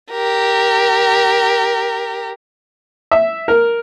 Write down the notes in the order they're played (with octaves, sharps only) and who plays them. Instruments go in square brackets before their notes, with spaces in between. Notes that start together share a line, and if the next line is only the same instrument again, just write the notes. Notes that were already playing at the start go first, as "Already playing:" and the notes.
[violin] G4 A#4
[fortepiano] E5
A#4